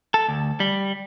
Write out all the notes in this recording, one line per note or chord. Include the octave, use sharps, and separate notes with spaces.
A4
D2
G3